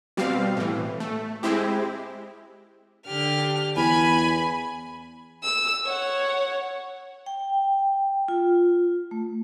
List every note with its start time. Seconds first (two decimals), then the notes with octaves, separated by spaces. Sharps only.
0.17 B2 G3 C4 F5
0.57 A2 E3
1.00 A3
1.43 G#3 C4 E4 G4
3.07 D3 G4 F6
3.77 E2 G#5 B5
5.43 E6
5.86 C#5 F#5
7.26 G5
8.28 F4
9.11 A3